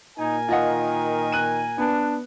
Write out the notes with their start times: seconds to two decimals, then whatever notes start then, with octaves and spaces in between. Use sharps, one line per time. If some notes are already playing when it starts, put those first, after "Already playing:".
0.18 A#2 D#4 A#4 G#5
0.48 D#3 F4 D#5 F#5
1.32 F#6 D#7
1.78 B3 D4